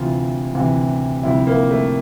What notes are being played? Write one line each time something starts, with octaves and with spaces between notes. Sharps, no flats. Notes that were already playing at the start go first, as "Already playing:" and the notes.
Already playing: D2 C3 E3 F4
D2 C3 E3
D2 C3 F3 E4
A#3
A3